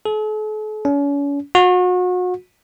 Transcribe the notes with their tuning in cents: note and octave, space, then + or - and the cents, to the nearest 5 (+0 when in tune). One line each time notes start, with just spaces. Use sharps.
A4 -45
C#4 +40
F#4 -35